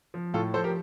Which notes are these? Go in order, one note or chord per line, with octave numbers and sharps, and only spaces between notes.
F3
A2 F4 A4
F3 A4 C5
G4 A#4